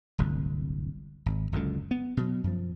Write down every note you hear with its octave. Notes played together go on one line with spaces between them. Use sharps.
D1 G1 C2
G#1
F#1 C#2 F#2 D3
B3
B2 F#3
F#2 F3